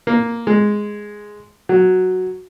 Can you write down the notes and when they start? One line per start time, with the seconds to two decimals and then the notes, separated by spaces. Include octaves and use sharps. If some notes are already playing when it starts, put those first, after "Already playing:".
0.07 A#3
0.47 G#3
1.69 F#3